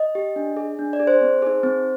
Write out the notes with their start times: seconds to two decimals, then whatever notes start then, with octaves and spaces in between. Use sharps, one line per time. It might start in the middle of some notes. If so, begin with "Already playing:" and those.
Already playing: D#5
0.15 G4
0.36 D4
0.57 G#4
0.79 D4
0.93 D5
1.00 G#4
1.07 C5
1.21 C4
1.42 D#4 G#4
1.63 C4